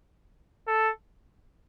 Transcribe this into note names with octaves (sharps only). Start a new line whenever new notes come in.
A4